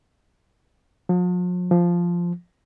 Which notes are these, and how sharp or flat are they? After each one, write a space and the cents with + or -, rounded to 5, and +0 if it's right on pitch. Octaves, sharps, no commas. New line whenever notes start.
F3 +45
F3 -5